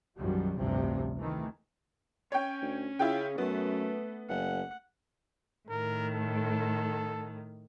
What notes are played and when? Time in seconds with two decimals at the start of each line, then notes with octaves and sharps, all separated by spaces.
0.18 B1 F#2 B2 D#3 F3 G3
0.57 A1 D2 G2 C3 F3
1.17 D#3 E3 A3
2.32 C#4 C#5 G5
2.62 D2
2.99 C#3 E4 F4 G5
3.38 F#2 A3 B3
4.29 F#1 F#5
5.69 A2 D#3 A#4
6.14 A4